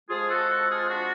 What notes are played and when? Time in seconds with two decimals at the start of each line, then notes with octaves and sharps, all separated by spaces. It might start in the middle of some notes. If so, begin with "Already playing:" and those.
0.09 F2 F3 G#3 F4 G#4
0.29 F#4 A4
0.48 F#4 A4
0.69 F4 G#4
0.89 D4 F#4